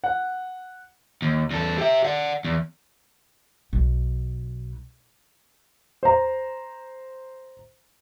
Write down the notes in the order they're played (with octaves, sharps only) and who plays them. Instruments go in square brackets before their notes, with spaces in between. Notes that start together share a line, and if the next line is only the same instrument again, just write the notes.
[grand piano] F#5
[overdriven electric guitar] D#2
E2 A4
G4 E5
D5 F#5
E2
[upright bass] B1
[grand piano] C5 A#5